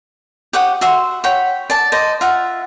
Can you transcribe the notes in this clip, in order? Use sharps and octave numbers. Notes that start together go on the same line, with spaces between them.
G4 C#5 F#5 D#6
F#4 E5 C6
C#5 F#5 G5 B5
D5 A5
C5 D5 D#5
F4 E5 F#5